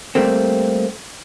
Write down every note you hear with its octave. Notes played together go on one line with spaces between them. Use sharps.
G3 A3 A#3 C4